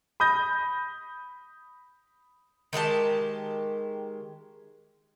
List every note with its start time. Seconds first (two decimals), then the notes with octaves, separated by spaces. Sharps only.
0.20 B5 D#6 G6 A#6
2.73 D#3 G#3 G4 A5